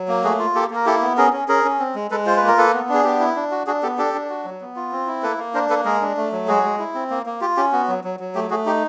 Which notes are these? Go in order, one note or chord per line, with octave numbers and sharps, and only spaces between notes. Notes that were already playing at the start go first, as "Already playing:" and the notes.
Already playing: F#3
A#3
A3 F#4 G#4
F4
A#3 G4 A4
A#3 A#4
E4 G4 A4
B3
C#4 G#4 A#4
C#4
C#4 G#4 A#4
C#4
C4
G#3
G#3 A4 B4
F4 C5
B4
A#3
A#4
A#3 A4 B4
B3
D4 G#4
B3 G4
E4
D4
F#4
D4 F#4 G#4
B3 G4 A4
D4 G4 A4
D4
F#4
F#3
B3
F4
C4
E4
A#3 A4 B4
A#3
D4 A#4 C5
A#3 A4 B4
G#3 G#4 A#4
D4
A3
F#3
G#3 F#4 G#4
G#3
E4
C4
A#3
A#3
F4 G4
C#4 G4
B3 F#4
F#3
F#3
F#3
A3 G4
A3 F#4 G#4
D#4 G4